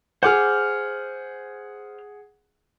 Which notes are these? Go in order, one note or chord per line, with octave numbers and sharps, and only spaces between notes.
G#4 C5 F#5 D6 F6